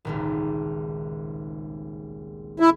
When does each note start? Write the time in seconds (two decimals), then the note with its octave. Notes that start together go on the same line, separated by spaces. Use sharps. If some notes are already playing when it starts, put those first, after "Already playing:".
0.05 D#1 G#1 C#2
2.60 E4